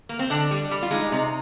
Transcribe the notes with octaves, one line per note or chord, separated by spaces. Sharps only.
A#3
C4
D3 D4
G3
G3
F4
G#3 D#4
C3